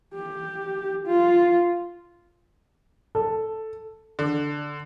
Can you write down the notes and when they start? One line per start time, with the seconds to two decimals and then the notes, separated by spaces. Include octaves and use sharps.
0.14 G4
1.06 F4
3.15 A4
4.19 D3